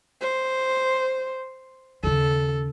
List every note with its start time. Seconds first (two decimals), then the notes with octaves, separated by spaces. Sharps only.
0.21 C5
2.03 D#2 C#3 A4